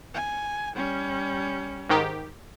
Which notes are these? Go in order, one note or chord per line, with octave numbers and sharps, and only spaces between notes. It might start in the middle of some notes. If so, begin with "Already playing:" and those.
G#5
G3 C#4
G#2 D#3 G4